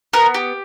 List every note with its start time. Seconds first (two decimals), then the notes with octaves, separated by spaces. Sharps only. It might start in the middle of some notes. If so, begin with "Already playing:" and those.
0.13 B3 A#4
0.35 G4